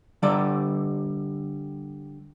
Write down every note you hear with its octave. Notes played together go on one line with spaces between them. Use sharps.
D3 G3 D5